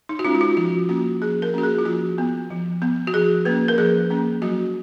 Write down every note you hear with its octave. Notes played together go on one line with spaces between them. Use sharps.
D#4
F#4
G#3 C#4 F4
F#4
F4
F3 F#4
A#3 C#4 F#4
F3 G#4
A#4
A#3 C#4 F#4
G#4
F4
F3 F#4
B3
F3
B3
F#4
F3 G#4
A#3 C#4 B4
A#4
F3 G#4
A#3 C#4
F#3 F#4